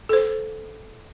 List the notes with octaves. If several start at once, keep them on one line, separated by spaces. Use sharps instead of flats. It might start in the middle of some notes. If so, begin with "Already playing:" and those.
A4 C5